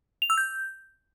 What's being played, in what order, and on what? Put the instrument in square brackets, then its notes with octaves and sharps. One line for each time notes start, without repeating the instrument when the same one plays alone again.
[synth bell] F7
E6
G6